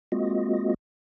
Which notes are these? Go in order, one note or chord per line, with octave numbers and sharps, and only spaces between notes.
G#3 A#3 C4 F4 F#4 D#5